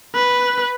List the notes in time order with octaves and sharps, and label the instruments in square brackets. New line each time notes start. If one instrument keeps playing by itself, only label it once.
[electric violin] B4